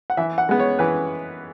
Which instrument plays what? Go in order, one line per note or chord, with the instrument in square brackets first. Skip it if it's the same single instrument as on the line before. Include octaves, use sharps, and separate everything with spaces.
[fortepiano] F#5
E3 E5
F#5
G#3 B3
C#5
E3 B4